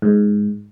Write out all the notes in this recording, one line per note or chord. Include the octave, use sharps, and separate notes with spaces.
G#2